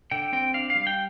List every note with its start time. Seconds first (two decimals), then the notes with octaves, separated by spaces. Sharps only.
0.11 D3 G5
0.33 C4 G5
0.54 D4 F5
0.70 F5
0.75 G3
0.87 G5